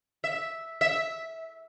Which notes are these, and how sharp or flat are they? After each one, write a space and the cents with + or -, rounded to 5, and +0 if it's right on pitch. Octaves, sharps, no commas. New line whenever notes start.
E5 -5
E5 -15